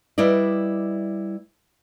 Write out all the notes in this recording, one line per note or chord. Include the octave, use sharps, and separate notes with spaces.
G3 E4 B4 D5 D#5